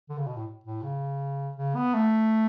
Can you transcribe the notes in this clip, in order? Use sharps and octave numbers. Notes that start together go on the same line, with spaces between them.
D3
C#3
B2
A2
A2
C#3
C#3
B3
A3